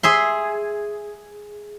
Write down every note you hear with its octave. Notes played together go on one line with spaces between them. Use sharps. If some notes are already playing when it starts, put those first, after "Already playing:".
G#4 E5 C6